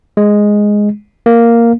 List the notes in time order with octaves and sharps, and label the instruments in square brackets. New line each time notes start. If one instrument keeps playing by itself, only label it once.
[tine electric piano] G#3
A#3